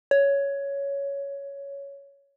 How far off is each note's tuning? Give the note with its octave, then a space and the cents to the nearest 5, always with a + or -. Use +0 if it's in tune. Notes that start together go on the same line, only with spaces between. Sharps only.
C#5 +10